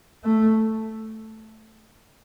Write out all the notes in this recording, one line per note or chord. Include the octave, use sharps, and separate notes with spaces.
A3